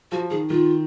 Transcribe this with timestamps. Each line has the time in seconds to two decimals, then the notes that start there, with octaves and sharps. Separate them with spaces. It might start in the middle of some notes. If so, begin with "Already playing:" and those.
0.12 F3 F#4
0.30 D#3 G#4
0.50 D#3 F4